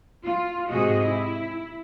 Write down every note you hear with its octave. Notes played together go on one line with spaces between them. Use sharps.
F4
G#2 C3 F#4 G#4 D#5
E4